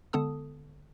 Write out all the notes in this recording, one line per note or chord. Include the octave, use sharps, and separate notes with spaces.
D3 G#3 B3 A4 A5 D#6